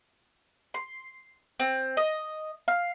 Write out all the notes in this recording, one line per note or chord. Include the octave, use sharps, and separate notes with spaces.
C6
C4
D#5
F5